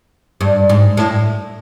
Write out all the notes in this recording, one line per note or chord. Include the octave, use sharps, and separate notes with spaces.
G2
G#2
A2